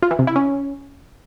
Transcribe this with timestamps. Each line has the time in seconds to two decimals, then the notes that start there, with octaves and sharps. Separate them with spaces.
0.02 F4
0.11 E3
0.19 C3
0.27 E4
0.36 C#4